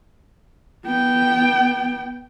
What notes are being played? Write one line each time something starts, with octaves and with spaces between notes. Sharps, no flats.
B3 G5